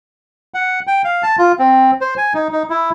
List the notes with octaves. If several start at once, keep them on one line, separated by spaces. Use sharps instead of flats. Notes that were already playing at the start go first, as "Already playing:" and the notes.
F#5
G5
F5
A5
F4
C4
C5
G#5
D#4
D#4
E4